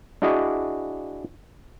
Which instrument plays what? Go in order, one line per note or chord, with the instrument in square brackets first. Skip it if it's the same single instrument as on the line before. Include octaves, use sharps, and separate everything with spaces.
[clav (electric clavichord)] D4 E4 F#4 G#4 D5 D#5